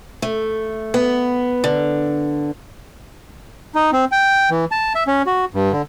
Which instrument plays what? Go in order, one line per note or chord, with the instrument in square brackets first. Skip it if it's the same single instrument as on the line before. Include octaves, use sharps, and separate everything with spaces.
[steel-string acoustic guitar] A3
B3
D3
[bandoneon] D#4
C4
G5
E3
A5
E5
C#4
F#4
G2
D3